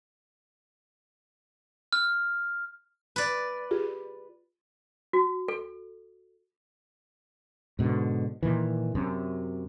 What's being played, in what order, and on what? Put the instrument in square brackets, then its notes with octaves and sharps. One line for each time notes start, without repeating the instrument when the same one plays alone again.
[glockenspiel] F6
[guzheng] B4 D5
[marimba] F4 G4 G#4
[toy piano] F#4
A4
[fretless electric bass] G#2 B2 D3
A#2 D#3 E3
F#2 C3